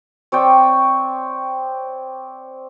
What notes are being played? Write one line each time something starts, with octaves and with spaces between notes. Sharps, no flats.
C4 C#5 D5 G5